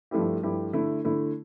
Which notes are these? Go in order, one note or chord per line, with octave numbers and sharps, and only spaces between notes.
G2 F3 A3 E4 G4
G2 F3 A3 E4 G4
D3 A3 E4
D3 A3 E4